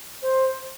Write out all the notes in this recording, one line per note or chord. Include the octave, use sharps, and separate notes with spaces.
C5